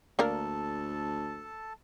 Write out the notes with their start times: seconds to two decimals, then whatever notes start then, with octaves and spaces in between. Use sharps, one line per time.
0.19 D2 A#3 D4 A4 A#4 A5